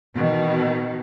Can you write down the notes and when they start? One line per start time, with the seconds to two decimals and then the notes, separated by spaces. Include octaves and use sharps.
0.14 B2 D#3 E3